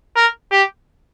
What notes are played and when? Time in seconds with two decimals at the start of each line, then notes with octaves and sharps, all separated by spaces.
0.16 A#4
0.52 G4